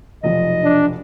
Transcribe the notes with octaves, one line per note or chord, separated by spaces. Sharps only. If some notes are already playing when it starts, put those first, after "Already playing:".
F1 B1 F3 D#5
D4